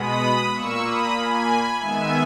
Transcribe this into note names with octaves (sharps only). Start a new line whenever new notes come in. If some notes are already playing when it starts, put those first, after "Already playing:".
Already playing: B2 G#3 B3 B5 D#6
A#2 A#3 C#6 E6
B5 D#6
G#5 B5
D#3 G#3 B3 E5 G#5